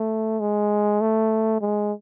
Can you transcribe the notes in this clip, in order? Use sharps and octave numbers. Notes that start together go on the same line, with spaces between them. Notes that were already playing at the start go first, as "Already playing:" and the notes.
Already playing: A3
G#3
A3
G#3